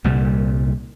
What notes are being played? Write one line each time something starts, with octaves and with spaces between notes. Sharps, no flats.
C2 A#2 G3